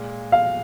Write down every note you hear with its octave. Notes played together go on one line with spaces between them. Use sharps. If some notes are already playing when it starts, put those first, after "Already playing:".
Already playing: A#2 G#3
F5